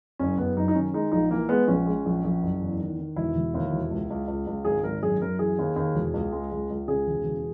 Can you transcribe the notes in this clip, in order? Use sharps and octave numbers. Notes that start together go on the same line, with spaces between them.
F#1 C#4
F#1 B3
F#2 D#4
D#4
D#3 C#4
G#3 D#4
A#1 D#4
E3 A#3
G#3 B3
A#1 C#4
G#3
A#1
A#1
F#1
E2
D#3
D#3
E1 E4
E1
D#2
E1
C#2
C#2
C#2
C#2
G#1 G#4
G#1 A#4
F#2 G#4
F#2 A#4
E3 G#4
D#2
D#2
E1
C#2
G#3
C#2
C#2
C#3 G#4
E1
E1